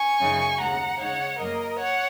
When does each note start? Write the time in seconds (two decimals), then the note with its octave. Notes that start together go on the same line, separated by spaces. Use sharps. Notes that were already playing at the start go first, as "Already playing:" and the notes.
Already playing: G#5 C#6
0.20 F#2 C#3 F#3 D#4
0.60 D#2 C#3 G#3 F#5 A#5
0.99 C#3 G#3 D#4 C#5 F#5
1.39 F#2 F#3 A#3 A#4 D#5
1.79 C#5 F#5